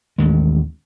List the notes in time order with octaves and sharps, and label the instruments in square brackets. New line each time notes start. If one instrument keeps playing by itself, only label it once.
[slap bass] A1 D#2 D#3 G#3